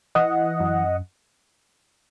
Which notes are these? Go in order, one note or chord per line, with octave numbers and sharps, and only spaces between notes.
E3 D#5 F#5
F#2